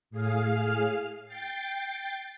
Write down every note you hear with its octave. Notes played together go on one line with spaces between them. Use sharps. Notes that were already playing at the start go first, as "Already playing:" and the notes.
A2 G#4 F5 F6
G5 A6 C7